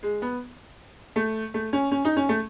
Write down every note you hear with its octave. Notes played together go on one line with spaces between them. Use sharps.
G#3
B3
A3
A3
C#4
C#4
D#4
C#4
A3